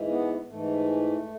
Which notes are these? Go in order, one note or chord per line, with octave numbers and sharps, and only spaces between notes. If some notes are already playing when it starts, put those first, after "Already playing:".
Already playing: G#2 E3
B3
G#2 E3 A3